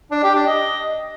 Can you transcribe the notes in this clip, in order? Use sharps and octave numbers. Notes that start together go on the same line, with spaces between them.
D4
G4
D4
D#5